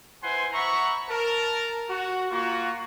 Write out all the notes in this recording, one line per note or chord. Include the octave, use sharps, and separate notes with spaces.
E4 B4 C5 F#5 G#5 C6
C5 E5 F#5 A#5 B5 C#6
A#4 A5
F#4
A#3 F4 F#4